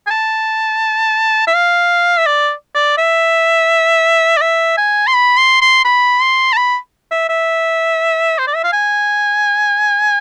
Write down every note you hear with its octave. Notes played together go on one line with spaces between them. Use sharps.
G#5
A5
E5
F5
E5
D5
D5
E5
D5
E5
G#5
C6
B5
C6
C6
B5
C6
A5
B5
E5
E5
C5
D5
E5
F5
G#5